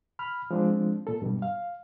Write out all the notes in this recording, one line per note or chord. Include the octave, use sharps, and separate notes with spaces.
B5 F6
F3 G#3 C4 D4
A#2 A4
G2 B2 G3
F5